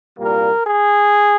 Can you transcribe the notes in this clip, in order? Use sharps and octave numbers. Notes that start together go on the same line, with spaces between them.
C2 A#2 G3 A#3 A#4
G#4